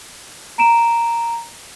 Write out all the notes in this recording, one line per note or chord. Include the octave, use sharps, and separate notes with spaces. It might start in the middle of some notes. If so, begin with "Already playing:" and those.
A#5 D7 E7